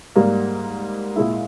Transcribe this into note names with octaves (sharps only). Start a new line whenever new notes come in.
G#2 G3 A#3
A#2 G#3 E4